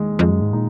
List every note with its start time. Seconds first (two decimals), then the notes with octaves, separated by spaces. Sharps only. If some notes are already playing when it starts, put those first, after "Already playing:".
Already playing: D#2 G#3
0.19 F2 G#3
0.30 F#2
0.42 G#2
0.53 A#2 D#4